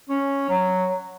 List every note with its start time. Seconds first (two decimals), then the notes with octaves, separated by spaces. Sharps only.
0.09 C#4
0.49 F#3